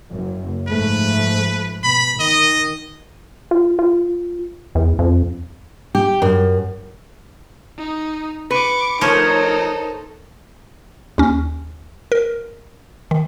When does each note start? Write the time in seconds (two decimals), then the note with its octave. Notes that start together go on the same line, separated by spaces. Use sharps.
0.10 F#1 F#2
0.68 G#2 F3 A3 B4
1.84 B2 B5
2.20 D#3 D#5
3.51 F4
3.79 F4
4.75 E2
4.99 F2
5.95 G4
6.22 F#2
7.77 D#4
8.51 B4 C#6 D6
9.01 F3 A3 D#4 A4 A#4 C5 C#5
11.18 D#2 C#4
12.12 A#4
13.11 D#3